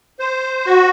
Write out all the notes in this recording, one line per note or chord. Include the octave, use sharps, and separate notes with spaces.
C5
F#4